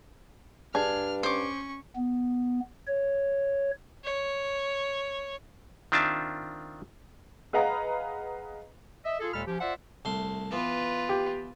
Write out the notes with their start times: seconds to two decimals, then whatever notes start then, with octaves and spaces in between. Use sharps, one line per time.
0.75 G2 D4 G#4 F6
1.23 C#4 C5 C#6 D6
1.96 B3
2.87 C#5
4.05 C#5
5.92 D#3 C4 D4 F4 E5 A5
7.53 G#4 B4 D#5 F5 F#5 A#5
9.05 D#5 E5
9.20 F4 G#4 A4
9.34 D#2 A#2 G#3 A4 B5 F6
9.47 F3 C#4 G4
9.61 F4 C5 D5 E5 F#5
10.05 C2 A3 C6
10.52 E3 B3 F4 B4
11.09 G4